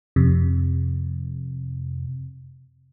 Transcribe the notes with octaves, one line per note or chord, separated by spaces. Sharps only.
F2 C3